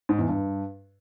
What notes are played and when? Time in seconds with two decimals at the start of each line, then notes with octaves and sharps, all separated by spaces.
0.09 G#2
0.18 E2
0.28 G2